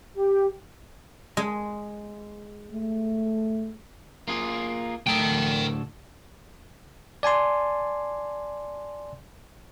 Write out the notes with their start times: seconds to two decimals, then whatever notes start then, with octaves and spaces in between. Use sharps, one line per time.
0.16 G4
1.37 G#3
2.72 A3
4.28 A#3 F4 G#4
5.07 D2 A2 A4 A#4 G5
7.23 D5 G#5 A5 C6